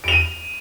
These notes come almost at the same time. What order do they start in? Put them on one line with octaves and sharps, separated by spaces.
D7 F7 D#7